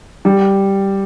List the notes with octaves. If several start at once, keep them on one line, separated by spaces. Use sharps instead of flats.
G3